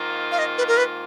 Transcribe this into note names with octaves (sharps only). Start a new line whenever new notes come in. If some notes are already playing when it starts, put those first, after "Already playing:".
Already playing: G#2 D#3 A#3 F4
F5
D#5
B4
A#4
B4